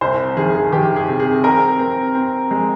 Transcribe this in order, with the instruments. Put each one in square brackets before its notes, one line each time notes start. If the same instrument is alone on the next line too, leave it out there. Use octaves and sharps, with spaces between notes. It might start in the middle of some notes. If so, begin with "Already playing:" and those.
[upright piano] C2 C5
D#3 G#4
G#4
D#3 G4
G#4
C3
G#4
C4 A#4
C4
C4
G#3